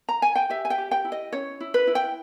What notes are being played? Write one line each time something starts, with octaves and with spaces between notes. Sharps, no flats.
A#5
G#5
G5
G4 E5
G#5
G5
G4
G5
E4
D#5
C#4 C#5
E4
B4
E4
G5